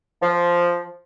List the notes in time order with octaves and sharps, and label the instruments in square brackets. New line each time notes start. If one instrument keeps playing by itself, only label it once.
[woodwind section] F3